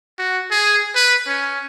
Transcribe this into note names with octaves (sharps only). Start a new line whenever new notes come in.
F#4
G#4
B4
C#4